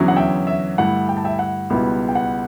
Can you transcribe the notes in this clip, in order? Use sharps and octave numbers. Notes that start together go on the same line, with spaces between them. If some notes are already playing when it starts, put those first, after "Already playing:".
Already playing: E2 D3 F#3 C#4 E4
F#5
E5 G5
E5
G2 D3 A3 E4 F#5
G5
A5
E5 G5
F#5
C#2 B2 G3 B3 E4 E5
G5
F#5